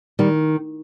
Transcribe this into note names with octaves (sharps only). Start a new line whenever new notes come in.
D#3 G3